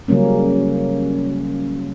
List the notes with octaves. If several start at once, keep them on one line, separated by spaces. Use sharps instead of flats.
C#3 F#3 G3 A#3 C#4